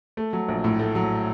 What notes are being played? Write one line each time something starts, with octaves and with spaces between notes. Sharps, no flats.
A3
F#3
A#1
A2
A3
F#3